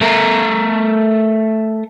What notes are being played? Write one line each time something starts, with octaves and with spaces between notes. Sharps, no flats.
A3 A#4